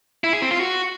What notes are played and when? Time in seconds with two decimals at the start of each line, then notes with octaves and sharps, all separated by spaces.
0.24 E4
0.33 G#4
0.42 C4
0.51 F4
0.60 F#4